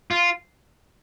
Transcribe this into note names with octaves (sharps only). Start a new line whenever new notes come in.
F4